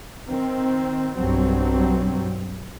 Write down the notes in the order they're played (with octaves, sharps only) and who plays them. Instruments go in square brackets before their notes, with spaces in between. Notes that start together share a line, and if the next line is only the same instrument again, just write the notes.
[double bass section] D#3 C4
B1 G2 F#3 G3 C4